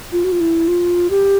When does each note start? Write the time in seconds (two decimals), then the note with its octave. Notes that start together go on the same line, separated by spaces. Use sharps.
0.12 F4
0.24 F#4
0.32 F4
0.40 E4
0.68 F4
1.10 G4